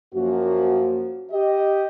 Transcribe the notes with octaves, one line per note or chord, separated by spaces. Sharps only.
F#2 F3 A#3 F#4
G4 D#5